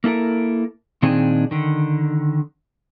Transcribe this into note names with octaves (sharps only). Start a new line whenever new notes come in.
A#3 E4 A4 A#4
A#2 D#3 C4 D4 D#4 G#4
D3 D#3